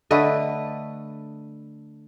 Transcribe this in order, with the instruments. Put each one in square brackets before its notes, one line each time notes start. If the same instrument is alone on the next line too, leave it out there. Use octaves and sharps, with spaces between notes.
[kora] D3 A3 B4 D#5